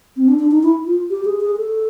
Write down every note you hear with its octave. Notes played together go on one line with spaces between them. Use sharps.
C4
D4
D4
D#4
E4
F4
G4
G#4
G#4
A4